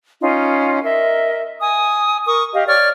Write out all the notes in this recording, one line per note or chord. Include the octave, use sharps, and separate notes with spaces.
C#4 D#4 F4
A#4 D#5 E5
G#5 D#6
A#4 C#6 D#6
G4 D#5 F5
C#5 D5 C#6 F6